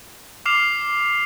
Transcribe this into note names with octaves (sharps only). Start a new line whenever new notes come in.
D6 F6 C7 F7